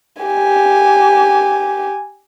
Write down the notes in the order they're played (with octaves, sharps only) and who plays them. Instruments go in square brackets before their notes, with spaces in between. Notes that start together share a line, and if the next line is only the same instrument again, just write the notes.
[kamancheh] G4 G#5